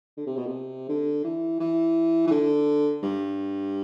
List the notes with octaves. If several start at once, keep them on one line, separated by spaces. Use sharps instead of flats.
D3
C3
B2
C3
D3
E3
E3
E3
D3
G2